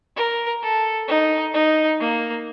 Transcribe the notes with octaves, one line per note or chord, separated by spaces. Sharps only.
A#4
A4
D#4
D#4
A#3